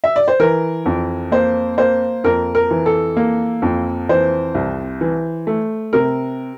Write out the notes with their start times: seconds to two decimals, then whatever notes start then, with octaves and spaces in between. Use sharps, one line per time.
0.04 E5
0.16 D5
0.28 C5
0.40 E3 A#4
0.86 F2
1.32 A#3 C5
1.78 A#3 C5
2.24 F2 A#4
2.55 A#4
2.71 E3
2.86 A4
3.17 A#3
3.62 F2
4.09 E3 C5
4.55 C2
5.01 E3
5.47 A3
5.93 C3 A#4